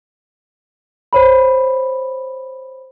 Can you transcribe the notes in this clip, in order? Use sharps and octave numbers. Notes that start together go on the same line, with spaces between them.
C5 C#5 B5